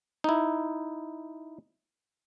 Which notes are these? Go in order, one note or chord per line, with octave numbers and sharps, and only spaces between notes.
D#4 E4